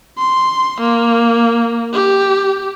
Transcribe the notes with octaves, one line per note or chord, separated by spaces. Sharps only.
C6
A#3
G4